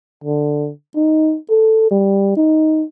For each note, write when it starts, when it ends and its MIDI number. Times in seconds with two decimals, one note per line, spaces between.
0.24 0.70 50
0.96 1.37 63
1.50 1.87 69
1.91 2.35 55
2.37 2.84 63